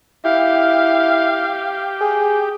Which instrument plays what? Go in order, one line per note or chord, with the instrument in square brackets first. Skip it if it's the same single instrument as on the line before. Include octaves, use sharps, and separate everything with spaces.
[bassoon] E4 [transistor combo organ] G4 [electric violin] F5
[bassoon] G#4